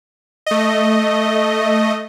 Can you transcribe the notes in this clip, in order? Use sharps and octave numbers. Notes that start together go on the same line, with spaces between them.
A3 D#5